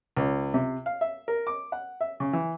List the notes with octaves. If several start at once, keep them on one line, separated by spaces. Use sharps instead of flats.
C#2
C3
F5
E5
A#4
D6
F#5
E5
C#3
E3